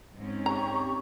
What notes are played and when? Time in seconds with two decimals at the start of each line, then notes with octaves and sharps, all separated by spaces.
0.15 G#2 C4 C#4
0.46 G4 A#5 C#6